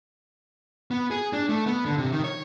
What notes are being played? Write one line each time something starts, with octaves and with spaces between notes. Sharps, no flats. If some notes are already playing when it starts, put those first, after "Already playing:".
B3
G#4
D4
A3
B3
D3
C3
D#3
C#5